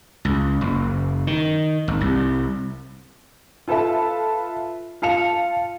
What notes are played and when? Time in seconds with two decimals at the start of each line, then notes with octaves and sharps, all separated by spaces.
0.25 C#2
0.61 F#1
1.27 D#3
1.88 G#1
2.01 C2
3.68 F4 A4 B4 E5 A5
5.02 F4 F5 A5 C#7 F7